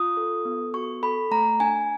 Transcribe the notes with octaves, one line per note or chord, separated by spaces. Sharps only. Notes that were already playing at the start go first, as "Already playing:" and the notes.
Already playing: F4 D#6
A4
B3
F#4 C#6
A4 B5
A3 A#5
D4 G#5